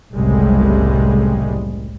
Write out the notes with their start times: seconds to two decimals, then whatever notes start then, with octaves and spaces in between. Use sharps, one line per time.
0.14 F#1 C2 A2 G3 G#3